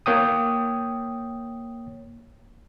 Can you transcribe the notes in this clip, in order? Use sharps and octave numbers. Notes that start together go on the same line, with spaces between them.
A#3 C#5 G5 D#6